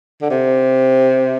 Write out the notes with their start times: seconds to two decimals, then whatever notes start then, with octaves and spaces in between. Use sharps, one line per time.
0.22 D3
0.30 C3